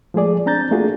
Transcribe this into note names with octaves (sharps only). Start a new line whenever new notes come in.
F3 G#3 A3 G#4 D5
C4 D4 A#5 G6 A6
A3 A#3 D4 F4 F#4 G#4